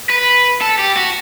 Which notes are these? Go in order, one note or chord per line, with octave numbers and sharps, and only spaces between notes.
B4
A4
G4
F#4